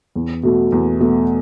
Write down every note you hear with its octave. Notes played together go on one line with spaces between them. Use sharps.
E2
B2 A3 F#4
E2
B2 A3 F#4